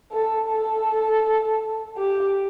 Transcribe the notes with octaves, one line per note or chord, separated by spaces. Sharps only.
A4
A4
G4